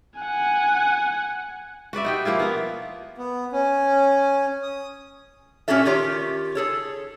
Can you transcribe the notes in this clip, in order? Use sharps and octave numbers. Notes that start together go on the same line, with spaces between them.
F#5 G#5
F#4 B4 D5 E5
D#4 G4 G5
F3 A#3 E4 F4
B3 A#4
B3
C#4
D#6
A#2 C#4 F#4 G4 A4 E5
D#3 F4 G4 C#5
G#4 A4 C#5